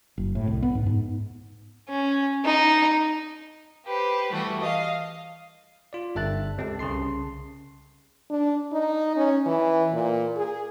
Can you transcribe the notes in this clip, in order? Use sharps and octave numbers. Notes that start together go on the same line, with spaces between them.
F#1
A2
C2
B3
G#2
G#2
C#4
D#4
G4 B4 C5
E3 G3 A3 F#4
D#5 F5
F4 D5
G1 G2 E5 A5 F#6 A6
C#2 C4 G4 A4 A5
C2 C#3 A5 C6 C7
D4
D#4
C#4
E3
A#2
G#4